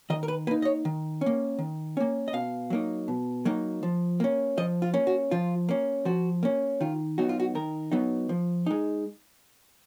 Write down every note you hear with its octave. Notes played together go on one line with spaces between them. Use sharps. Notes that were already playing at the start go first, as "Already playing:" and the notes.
D#3 D#5
A#4
B4
A#3 D#4 B4
D#5
C#5
D#3
C#4
A#3
D#3
A#3 C#4
D#5
B2 F5
F#3 A#3 D#4
B2
F#3 A#3 D#4
F3
A#3 C#4
F3 D#5
F4
A#3 C#4
F#4
F3 F4
A#3 C#4
F3 F#4
A#3 C#4
D#3 F4
F#3 B3 D#4 F#4
F4
F#4
D#3 A#4
F#3 B3 D#4
F3
G#3 D#4